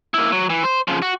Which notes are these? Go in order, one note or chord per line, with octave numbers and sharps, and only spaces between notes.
A#3 E4
F#3
E3
C5
C#3 F3
F#4